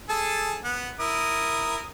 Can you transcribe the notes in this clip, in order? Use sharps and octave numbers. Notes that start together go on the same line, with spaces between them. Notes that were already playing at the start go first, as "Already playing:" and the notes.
G#4 A4 A5
B3 F#5
E4 A#4 D#6